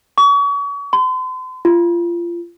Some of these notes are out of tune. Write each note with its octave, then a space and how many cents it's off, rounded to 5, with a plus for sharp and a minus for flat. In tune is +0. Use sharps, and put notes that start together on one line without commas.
C#6 +35
C6 -40
F4 -25